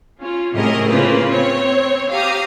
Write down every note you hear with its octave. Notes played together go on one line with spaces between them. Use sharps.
C#4 F4
A2 C3 C#4 G#4 A#4 D#5
C#3 A#3 F4 B4 C5
C4 C#5
G4 F5 A#5 D#6